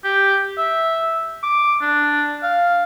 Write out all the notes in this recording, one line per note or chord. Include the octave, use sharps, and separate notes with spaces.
G4
E5
D6
D4
F5